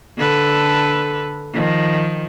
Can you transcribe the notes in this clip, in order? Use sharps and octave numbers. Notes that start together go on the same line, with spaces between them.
D3 A4 B4
D#3 F3